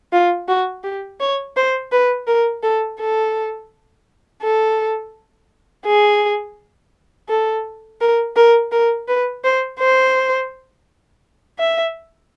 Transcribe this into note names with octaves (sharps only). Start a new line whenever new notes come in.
F4
F#4
G4
C#5
C5
B4
A#4
A4
A4
A4
G#4
A4
A#4
A#4
A#4
B4
C5
C5
E5